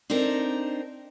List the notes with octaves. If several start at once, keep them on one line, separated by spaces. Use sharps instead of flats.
C4 D4 D#4 A4 A#4